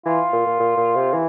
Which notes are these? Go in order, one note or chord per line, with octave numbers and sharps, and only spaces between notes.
E3 F4
A#2
A#2
A#2
A#2
C3
E3